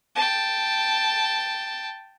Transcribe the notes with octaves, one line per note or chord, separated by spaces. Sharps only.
G5 A5